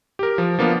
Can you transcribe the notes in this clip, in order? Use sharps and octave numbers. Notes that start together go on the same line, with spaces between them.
G4 A#4
F3
F3 A#3 B3 D4 F4